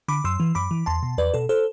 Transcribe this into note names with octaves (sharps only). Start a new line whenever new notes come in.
D3 B5 D6
F#2 C6 E6
E3
F#2 B5 D6
E3
E2 A5 C6
B2
E2 B4 D5
B2 A4
A4 C5